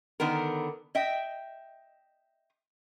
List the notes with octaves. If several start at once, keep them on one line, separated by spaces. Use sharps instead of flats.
D3 D#3 B3 A#4
D#5 E5 G5